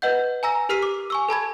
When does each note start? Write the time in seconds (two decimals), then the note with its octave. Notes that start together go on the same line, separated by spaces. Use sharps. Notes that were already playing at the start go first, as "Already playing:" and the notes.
0.02 B4 D#5 F#5 G6
0.43 G#5 A#5 E6 A#6
0.69 G4 A#4 F6 B6 C7 D#7
0.83 D6
1.10 G#5 C#6 E6
1.29 A4 A5 B5 G#6